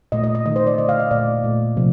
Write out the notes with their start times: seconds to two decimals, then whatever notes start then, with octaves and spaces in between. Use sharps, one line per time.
0.12 A#2 A3 D#5
0.24 D#5
0.35 D#5
0.45 D#3 A3 D#5
0.56 C5
0.67 D5
0.78 D3 A3 D#5
0.89 F5
1.00 D#5
1.11 A#2 A3 D5
1.44 A#2 A3
1.77 C3 F3 A3